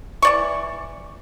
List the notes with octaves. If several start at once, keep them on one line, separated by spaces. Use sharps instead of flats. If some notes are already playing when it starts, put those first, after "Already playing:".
E3 D5 C#6